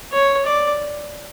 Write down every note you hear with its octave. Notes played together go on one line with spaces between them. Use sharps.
C#5
D5